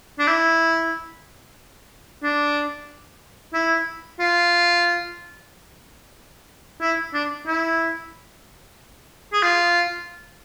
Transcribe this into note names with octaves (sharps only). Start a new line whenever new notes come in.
D4
E4
D4
E4
F4
E4
D4
E4
G#4
F4